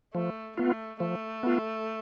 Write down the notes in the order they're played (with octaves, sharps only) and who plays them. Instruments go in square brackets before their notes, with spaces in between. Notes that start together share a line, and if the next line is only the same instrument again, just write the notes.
[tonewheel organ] F3 [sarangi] A3
[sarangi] A3 [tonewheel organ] B3 F4
[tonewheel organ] F3 [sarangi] A3
[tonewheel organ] B3 F4